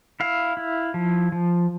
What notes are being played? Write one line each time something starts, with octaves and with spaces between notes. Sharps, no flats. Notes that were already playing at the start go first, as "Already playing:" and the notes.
E4 F5
E4
F3
F3